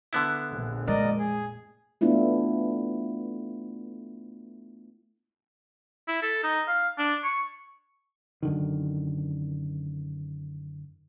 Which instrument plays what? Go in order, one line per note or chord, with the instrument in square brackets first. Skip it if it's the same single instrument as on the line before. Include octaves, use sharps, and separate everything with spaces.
[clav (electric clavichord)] D3 B3 E4
[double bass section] F1 A#1
[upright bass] G#3 [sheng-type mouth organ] A#4 D5 D#5
[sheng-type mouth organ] G#4
[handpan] A3 B3 D4 E4 F4
[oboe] E4
A4
D#4
F5
D4
C#6
[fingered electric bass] F#2 D3 D#3